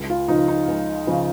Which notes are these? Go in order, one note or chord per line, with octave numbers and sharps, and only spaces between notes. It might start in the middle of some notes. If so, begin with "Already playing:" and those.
Already playing: C#2
F4
C#3 F3 D#4
D#4
C#2
C#3 F3